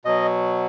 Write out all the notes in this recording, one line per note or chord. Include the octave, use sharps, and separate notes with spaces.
B2 F#3 D#5